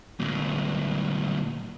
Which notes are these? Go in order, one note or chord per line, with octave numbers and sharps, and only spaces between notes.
D2 A#2